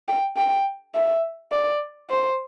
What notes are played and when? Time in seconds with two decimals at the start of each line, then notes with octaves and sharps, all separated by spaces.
0.08 G5
0.37 G5
0.95 E5
1.52 D5
2.10 C5